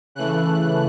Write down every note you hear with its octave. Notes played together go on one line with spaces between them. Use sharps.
C#3 E3 A3 F#6